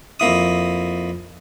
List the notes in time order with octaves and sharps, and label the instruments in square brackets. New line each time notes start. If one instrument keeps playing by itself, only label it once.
[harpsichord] F2 A#3 E4 D#6